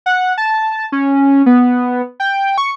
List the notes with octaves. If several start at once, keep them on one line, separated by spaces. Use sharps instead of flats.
F#5
A5
C#4
B3
G5
C#6